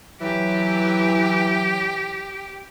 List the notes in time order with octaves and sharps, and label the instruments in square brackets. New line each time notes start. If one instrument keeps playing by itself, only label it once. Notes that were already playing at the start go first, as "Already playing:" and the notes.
[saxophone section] E3 [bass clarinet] F#3 [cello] G4